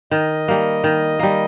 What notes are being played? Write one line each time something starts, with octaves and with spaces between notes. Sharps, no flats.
D#3 D#5
G3 A#3
D#3
G3 A#3